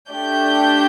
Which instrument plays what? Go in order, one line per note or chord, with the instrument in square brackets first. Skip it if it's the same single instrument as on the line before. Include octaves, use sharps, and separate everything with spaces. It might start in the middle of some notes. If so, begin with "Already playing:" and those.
[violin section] A3 D4 G4 G6